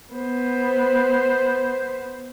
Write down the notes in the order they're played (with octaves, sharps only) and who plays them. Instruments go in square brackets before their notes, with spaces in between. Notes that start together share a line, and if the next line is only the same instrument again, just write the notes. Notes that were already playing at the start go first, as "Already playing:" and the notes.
[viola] B3 C5